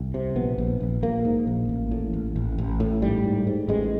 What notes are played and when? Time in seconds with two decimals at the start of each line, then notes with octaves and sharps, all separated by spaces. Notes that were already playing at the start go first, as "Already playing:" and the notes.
Already playing: C2
0.14 C3
0.35 A#1 B3
0.58 A#1
0.80 A#1
1.02 A#1 A#3
1.25 G#2
1.47 A#1
1.69 A1
1.91 A2
2.13 A1
2.36 A1
2.58 A1
2.80 A2
3.02 G#2 G3
3.24 G#2
3.47 G#2
3.68 A1 G#3